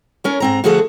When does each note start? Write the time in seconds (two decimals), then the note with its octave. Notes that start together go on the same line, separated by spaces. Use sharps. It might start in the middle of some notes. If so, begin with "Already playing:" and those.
0.24 C#4 A#4 C#5
0.40 G#2 C4 A#5
0.64 D3 F3 A3 F#4 G#4 A4